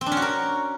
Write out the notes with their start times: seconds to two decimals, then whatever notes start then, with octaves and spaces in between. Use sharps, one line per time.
0.01 C4
0.06 D4
0.12 C#4
0.17 F#4
0.22 A#4